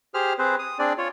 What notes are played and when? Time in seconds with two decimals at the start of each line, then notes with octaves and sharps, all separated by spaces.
0.14 G4 G#4 C5 F6
0.39 C4 G#4 B4 C5
0.59 D#6
0.79 C4 D4 G#4 D5
0.98 F4 C#5